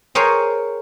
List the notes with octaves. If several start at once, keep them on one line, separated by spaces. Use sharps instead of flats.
G#4 A#4 C5 C#5 G5 G#5